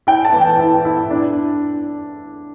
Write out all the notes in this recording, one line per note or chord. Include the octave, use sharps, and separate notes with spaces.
E4 G5
A5
E3
G5
E4
E4
D4